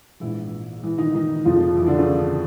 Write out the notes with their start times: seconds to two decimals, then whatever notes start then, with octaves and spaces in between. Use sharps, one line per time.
0.20 A#1 G#2 E3 E4
0.83 E3 E4
0.98 D#3 D#4
1.15 D#3 D#4
1.45 F1 F2 C#3 F3 F4
1.76 E3 E4
1.87 D3 D4
1.98 C#3 C#4